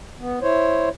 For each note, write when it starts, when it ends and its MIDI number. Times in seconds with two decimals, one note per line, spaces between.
0.19 0.39 59
0.42 0.89 64
0.42 0.89 72
0.42 0.89 73